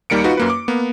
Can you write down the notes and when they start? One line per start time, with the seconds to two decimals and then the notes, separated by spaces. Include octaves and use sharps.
0.10 D#2 D#3 G3 A#3 C#7 D7
0.24 D#4 F4 F#4 B4
0.37 F#2 A#3 B4
0.50 D6
0.68 A#3 B3